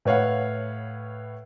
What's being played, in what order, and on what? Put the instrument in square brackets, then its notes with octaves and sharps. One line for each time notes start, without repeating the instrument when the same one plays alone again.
[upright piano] A2 B4 C#5 F5 F#5